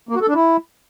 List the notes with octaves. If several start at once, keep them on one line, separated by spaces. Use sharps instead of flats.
A#3
F#4
A4
D4
E4